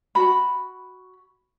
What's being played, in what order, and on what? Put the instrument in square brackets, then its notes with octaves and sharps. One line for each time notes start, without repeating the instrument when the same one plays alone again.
[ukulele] F#4 B5